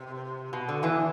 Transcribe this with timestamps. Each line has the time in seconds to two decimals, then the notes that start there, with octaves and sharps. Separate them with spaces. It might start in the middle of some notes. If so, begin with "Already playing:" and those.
Already playing: C3
0.53 B2
0.69 D3
0.83 E2 E3